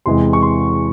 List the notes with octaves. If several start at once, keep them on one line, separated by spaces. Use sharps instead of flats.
E2 C3 E3 G#3 C6
C#6
C6